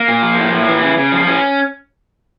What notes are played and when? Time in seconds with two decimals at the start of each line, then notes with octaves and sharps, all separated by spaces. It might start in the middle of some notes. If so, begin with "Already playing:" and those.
Already playing: A#3
0.08 A#2
0.22 F3
0.38 A2
0.52 A2
0.68 E3
0.82 C#3
0.97 C#3
1.12 F3
1.27 A2 C#4